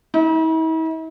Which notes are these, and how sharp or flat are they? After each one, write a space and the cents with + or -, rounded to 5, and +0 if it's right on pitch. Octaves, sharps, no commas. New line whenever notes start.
E4 -45